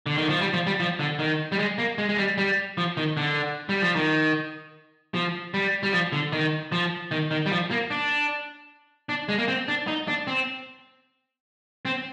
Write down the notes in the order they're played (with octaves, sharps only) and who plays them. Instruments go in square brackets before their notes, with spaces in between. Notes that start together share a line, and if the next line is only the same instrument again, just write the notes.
[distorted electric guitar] D3
D#3
F3
G3
F3
G3
F3
D3
D#3
G3
G#3
A#3
G#3
G#3
G3
G3
F3
D#3
D3
G3
F3
D#3
F3
G3
G3
F3
D3
D#3
F3
D#3
D#3
G3
F3
A#3
D4
D4
G#3
A#3
C4
D4
D#4
D4
C4
C4